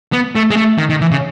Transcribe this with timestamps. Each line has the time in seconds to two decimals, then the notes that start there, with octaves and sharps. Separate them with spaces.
0.13 B3
0.35 A3
0.51 G#3
0.57 A3
0.78 D#3
0.90 D#3
1.01 E3
1.11 C#3